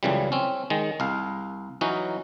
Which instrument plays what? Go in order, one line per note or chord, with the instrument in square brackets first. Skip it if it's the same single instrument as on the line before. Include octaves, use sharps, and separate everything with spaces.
[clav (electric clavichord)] C#2 F#2 C#3 E3 G3
C4 C#4
D#3 G#3
C2 F5
E3 F#3 C#4 D#4 F#4